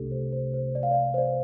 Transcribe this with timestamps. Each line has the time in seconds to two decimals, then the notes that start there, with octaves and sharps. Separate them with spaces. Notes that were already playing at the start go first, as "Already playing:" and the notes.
Already playing: C2 C3 A3 D4 G4 A4
0.11 C5
0.33 C5
0.54 C5
0.75 D5
0.83 F5
0.91 D5
1.14 C5
1.18 D5